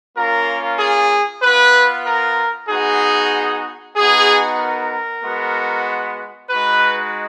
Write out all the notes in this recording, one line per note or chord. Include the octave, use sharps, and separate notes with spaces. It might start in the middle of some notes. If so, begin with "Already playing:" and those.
A#3 C#4 F4 A#4
G#4
B3 F4 B4
A#4
B3 D#4 F#4 G#4
B3 D#4 F#4 G#4
A#4
G#3 B3 F#4
G#3 D#4 F#4 B4